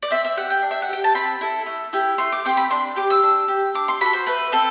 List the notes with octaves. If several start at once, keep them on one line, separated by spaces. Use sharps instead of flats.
D5
C4 E5
E5
G4 F#5
G5
D4
E5
F#5
G4 G5
A5
C4 B5
E4 A4
A3
E4 G4
A3 C6
D6
C4 G4 C6
B5
D4 C6
G4 D6
E6
D4
G4
D4 D6
C6
F#4 A4 B5
C5
A3 B4
C4 A4